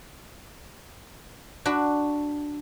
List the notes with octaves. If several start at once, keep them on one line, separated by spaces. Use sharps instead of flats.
D4 F#4 B5